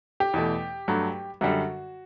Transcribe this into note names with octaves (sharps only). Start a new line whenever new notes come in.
G4
E2 B2 A3
G2 F#3 A3
F#2 D3 G3 F#4